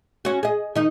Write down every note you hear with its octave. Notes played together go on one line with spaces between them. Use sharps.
C#4 F#4
G#4 D#5
D#3 D#4